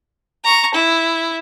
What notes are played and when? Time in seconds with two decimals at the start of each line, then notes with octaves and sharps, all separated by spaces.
0.44 A#5 C#6
0.75 E4